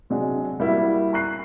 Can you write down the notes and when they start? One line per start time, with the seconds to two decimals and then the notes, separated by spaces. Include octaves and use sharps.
0.10 C3 F#3 G#3 D4
0.60 G3 A#3 E4 F#4
1.13 A#5 C#6 F#6 C7